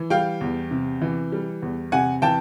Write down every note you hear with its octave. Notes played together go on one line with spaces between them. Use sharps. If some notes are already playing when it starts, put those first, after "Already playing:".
Already playing: E3
G3 F5 G5
E2
C3
E3
G3
E2
C3 F#5 G#5
E3 G5 A5